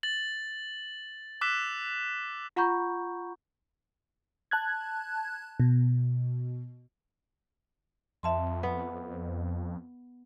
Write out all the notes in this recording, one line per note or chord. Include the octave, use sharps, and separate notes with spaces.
A6 F#7
D6 E6 F#6 B6 E7
F4 F#5 A#5 B5 C#6 G6
A5 F#6 G#6
B2
F2 E5 A5 C6
B3